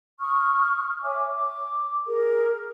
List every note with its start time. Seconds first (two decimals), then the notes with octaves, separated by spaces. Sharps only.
0.20 C#6 D#6 F6
1.02 C#5 E5 G#5 D6
1.33 D6
2.07 G#4 A#4